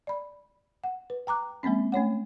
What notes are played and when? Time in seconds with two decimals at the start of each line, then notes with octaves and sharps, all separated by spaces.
0.07 D5 B5
0.84 F#5
1.10 B4
1.27 G5 A#5 D6 F#6
1.63 F3 G#3 A#3 C4 C#4
1.92 A3 C#4 C#5 F#5